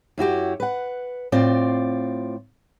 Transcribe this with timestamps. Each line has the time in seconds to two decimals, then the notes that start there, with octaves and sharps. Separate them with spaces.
0.18 F#2 E4 F#4 G4
0.60 B4 F#5
1.32 A2 C4 F4 D5